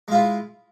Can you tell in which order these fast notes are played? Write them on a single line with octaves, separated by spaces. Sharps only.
G#3 F4 E4